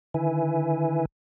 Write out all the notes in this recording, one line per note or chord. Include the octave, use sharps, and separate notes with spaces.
D3 D#3 E4 B4 E5 G#5